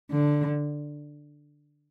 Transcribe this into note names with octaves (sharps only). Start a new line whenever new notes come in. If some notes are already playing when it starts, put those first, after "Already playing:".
D3